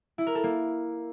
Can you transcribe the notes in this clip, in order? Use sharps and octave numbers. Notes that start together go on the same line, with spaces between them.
E4
A#4
A4
A#3